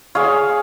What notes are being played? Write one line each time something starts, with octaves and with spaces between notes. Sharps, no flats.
G#4 C#5 F5